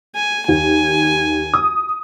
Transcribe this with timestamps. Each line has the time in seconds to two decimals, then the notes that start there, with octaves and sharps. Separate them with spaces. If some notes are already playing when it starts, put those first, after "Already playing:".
0.15 G#5
0.48 D#2 G#5
1.54 D#6